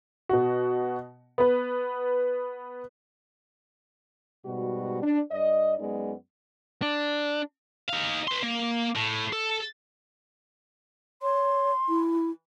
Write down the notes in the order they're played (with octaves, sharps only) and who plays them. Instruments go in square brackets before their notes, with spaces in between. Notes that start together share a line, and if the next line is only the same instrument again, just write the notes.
[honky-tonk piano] B2 F#4
B3 B4
[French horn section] G#2 B2 G3 F#4
D4
G2 D5 D#5
F#2 G#3 B3 D#4 D5
[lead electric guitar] D4
[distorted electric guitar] D#4 F5
B4 C6
A#3
A2
A4
[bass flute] C#5 [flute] C6
[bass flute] E4